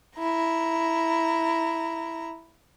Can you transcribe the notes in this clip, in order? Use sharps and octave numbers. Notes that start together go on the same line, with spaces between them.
E4 A#5